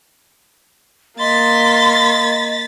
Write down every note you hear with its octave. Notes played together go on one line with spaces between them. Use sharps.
A#3 D#5 C6 A6 B6